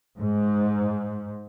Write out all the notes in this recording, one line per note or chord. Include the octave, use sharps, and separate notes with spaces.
G#2